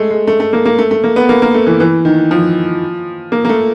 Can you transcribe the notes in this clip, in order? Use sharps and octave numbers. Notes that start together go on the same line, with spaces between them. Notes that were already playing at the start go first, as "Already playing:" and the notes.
Already playing: G#3 A3
G#3
A3
A3
A#3
A#3
A3
A3
A#3
B3
A#3
A#3
A3
E3
E3
D#3
F3
A#3
A#3
A3